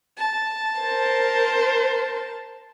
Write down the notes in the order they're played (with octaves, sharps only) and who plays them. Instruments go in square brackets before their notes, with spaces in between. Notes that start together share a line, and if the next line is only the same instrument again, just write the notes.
[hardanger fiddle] A5
[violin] A#4 C5